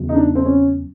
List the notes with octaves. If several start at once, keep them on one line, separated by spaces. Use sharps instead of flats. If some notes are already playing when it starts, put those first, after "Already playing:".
Already playing: E2 C#3 F#3 B3
D#4
D4
C4
C#4